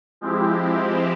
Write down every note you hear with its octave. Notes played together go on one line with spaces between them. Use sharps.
F3 G#3 C4 E4 G4